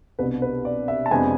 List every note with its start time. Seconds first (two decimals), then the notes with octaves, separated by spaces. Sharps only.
0.19 C2 B2 B3 D4 B4
0.42 B4
0.65 D5
0.88 E5
1.06 A5
1.10 F2 C3 G#3 B3 D4 G#5